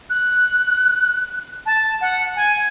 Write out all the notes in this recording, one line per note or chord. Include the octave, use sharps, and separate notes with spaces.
F#6
A5
F#5
G#5